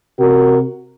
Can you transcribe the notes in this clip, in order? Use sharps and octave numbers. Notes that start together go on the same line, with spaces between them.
C3 F#4 A#4